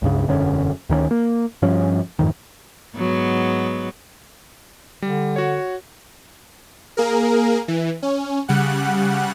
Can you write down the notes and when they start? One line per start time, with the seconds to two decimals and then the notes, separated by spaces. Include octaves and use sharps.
0.02 C#2 G2 C#3
0.27 E1 F#2 D3 C#4
0.89 D2 D#3 F#3 C#4
1.11 A#3
1.62 G2 F3 C#4
2.19 F2 G#2 D#3
2.96 G#2 F#3 B3
5.02 D3 G3
5.36 F#4 C#5
6.97 A#3 G#4 A#4
7.68 E3
8.03 C#4
8.48 C#3 G3 F#5 F#6